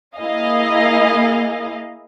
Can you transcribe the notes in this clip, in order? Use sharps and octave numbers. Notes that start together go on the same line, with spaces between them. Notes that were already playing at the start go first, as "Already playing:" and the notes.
A#3 E4 G#4 D#5 F5